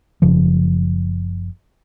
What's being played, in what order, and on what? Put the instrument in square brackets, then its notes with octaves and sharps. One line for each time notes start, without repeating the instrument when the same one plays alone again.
[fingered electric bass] F#1 C#3 F3